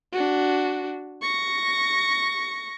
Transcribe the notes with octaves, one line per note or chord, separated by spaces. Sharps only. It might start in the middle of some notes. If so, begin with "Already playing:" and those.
D4 F#4
C#6 A#6